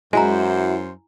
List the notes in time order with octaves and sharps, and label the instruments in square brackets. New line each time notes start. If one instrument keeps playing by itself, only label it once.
[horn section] F#2 C5 [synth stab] G#3 [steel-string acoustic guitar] E4 F#4 [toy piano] G#5 A#5